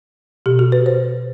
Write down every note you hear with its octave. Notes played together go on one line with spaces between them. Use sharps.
B2 G4
F#4
B4
C5